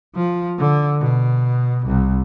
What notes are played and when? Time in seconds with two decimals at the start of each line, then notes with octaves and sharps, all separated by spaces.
0.16 F3
0.58 D3
1.01 B2
1.86 C2